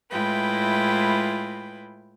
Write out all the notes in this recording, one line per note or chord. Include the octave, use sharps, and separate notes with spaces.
A2 G#3 E4 F4 B4 G5